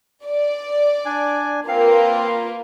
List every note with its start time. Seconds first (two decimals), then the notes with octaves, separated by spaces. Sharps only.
0.24 D5
1.05 D4 G#5
1.68 A#3 C4 F4 B4 F5